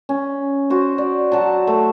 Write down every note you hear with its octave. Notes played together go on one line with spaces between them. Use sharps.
C#4
F#4 C5
D5
F#3 F#5 A5
A3